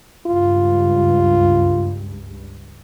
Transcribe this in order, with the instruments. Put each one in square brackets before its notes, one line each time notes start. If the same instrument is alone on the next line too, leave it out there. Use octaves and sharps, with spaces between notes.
[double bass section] C#2 G2 [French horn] F4